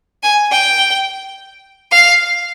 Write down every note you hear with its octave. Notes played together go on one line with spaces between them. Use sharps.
G#5
G5
F5